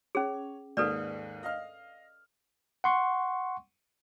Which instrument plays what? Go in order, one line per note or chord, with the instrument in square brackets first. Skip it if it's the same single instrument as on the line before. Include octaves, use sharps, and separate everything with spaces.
[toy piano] C#4 G#4 [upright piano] C#5
[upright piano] D#2 G#2 [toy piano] A4 B4 D5
[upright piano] D#5 F5 F6
[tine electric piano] F#5 C6 C#6